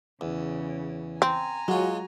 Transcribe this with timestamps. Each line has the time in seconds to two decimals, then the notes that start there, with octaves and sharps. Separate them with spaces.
0.21 E2 C#3
1.22 C4 G#5 A#5
1.68 F#3 G#3 F4 F#4